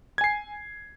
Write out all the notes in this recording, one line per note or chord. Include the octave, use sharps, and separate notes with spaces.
G#5 G#6 C7